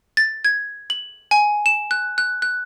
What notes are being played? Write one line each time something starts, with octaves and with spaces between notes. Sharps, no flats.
A6
G#6
F#7
G#5
E7
F#6
F#6
F#6